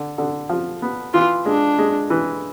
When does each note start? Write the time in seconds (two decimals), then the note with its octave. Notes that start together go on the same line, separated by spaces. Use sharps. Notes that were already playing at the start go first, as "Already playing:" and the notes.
Already playing: D3
0.18 D3
0.49 F3
0.82 B3
1.14 E3 F4
1.46 G#3 D4
1.79 G#3
2.10 E3